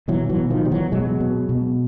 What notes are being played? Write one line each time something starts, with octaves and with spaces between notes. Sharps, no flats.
B2 E3 F#3
E3 F#3
B2
D#3 F3
B2 G3
E3 F#3
B2 F#3 G#3
B2
B2